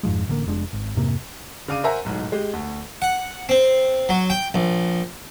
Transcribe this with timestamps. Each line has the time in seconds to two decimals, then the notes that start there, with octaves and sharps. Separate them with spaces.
0.03 F2 G#2 F3 G#3
0.28 A1 D3 F3 A#3
0.46 F1 G#3 D4
0.73 G#1
0.97 F2 G#2 C3 A#3
1.68 C#3 D4 F5 D6 D#7
1.84 A#4 C5 E5 F#5 G#5 A#5
2.05 D1 B1 G#2
2.32 G#3 G4
2.53 D2
3.02 F#5
3.49 C4
4.09 F#3
4.30 G5
4.54 A#1